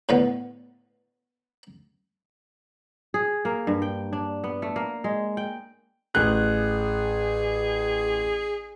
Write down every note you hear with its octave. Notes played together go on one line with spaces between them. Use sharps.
A2 D3 B3
G#4
A#3
G2
G5
D4
B3
A3
A#3
G#3
G5
A1 G#4 F#6